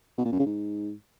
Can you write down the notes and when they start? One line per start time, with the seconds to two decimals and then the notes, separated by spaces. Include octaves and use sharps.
0.18 B2
0.25 A#2
0.32 F#2
0.39 C#3
0.46 G#2